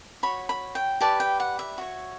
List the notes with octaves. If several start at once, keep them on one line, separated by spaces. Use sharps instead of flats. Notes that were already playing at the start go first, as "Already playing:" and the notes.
F#4 C#5 B5
B5
G5
G4 B4 D5 A5
G5
F#5
E5
F#4 C#5